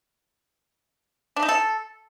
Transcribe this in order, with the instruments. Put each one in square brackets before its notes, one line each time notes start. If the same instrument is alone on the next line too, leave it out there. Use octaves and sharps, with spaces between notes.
[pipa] D4
D#4
A4